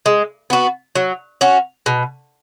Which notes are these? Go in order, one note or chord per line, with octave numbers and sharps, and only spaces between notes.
G#3
B3 F#4
F#3
C#4 F#4
B2